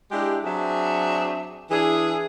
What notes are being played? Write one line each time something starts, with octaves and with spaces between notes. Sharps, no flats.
G#3 D4 E4 G4
F#3 C4 D4 G#4 E5
E3 D4 E4 G#4